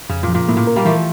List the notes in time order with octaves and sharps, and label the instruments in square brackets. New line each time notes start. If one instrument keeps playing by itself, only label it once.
[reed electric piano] F2 [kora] C#3
[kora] A#2
[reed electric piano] F3
[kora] A#2
[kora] A2 [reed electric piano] A#3
[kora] A#2
[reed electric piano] A#4
[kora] G3 A#3
[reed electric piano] E3 [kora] F3 A3